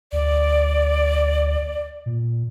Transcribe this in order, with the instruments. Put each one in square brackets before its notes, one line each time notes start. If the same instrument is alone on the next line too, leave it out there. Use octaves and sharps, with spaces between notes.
[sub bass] D2 [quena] D5
[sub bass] A#2